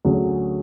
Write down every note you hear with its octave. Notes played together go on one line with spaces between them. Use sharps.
D2 D3 F#3 C#4 G#4